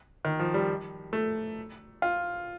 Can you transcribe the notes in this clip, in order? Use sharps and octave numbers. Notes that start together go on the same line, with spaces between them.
D#3
F3
G3
A3
F4